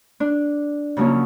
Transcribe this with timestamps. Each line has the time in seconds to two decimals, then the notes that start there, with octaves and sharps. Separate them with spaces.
0.20 D4
0.97 C#3 F3 F#3 A#3 C#4